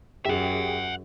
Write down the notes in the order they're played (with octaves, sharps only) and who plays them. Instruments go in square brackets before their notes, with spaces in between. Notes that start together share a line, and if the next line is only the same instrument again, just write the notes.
[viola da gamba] F#2 [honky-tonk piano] G4 G#4 [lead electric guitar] E5 F#5